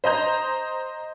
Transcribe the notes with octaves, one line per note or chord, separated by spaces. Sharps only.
C5 D#5 A#5 G6